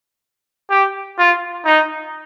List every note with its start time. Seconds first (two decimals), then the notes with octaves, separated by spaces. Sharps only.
0.70 G4
1.19 F4
1.65 D#4